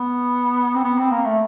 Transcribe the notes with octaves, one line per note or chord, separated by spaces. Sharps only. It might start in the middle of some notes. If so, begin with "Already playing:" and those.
Already playing: B3
C4
B3
C4
A#3
A3